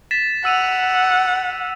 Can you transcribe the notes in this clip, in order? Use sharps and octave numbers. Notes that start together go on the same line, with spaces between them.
A6 B6 E7
F#5 E6 D#7 F7